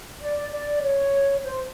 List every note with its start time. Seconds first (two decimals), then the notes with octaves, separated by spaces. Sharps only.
0.22 D5
0.52 D5
0.82 C#5
1.43 C5